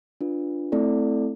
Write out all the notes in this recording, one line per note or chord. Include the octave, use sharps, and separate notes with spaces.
D4 F4 B4
A3 C4 E4 A4 D5